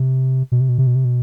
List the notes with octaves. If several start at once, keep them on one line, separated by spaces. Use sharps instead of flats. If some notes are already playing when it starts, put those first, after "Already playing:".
Already playing: C3
B2
C3
B2
C3
B2
C3
B2